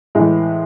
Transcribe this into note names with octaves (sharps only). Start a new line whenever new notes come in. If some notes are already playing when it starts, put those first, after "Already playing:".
A2 E3 G#3